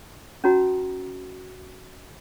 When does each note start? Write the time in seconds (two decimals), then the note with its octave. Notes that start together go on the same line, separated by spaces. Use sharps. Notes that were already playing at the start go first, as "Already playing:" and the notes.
0.44 C#4 D#4 F#4 A#5